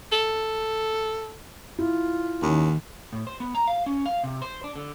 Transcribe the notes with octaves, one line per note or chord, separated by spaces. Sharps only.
A4
E4 F4
D#2 D#3 C#4
A2
C5
B3
A#5
F5
C#4
F5
C3
C5
D4
D3